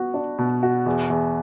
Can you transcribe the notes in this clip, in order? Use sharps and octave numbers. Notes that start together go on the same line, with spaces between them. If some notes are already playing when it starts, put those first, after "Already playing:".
Already playing: B3 F#4
D4
B2
F#4
E2
E2